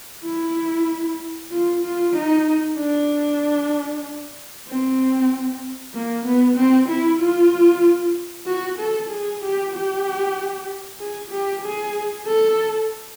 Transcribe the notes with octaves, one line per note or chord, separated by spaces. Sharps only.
E4
F4
F4
D#4
D4
C4
A#3
B3
C4
E4
F4
F#4
A4
G#4
G4
G4
G#4
G4
G#4
A4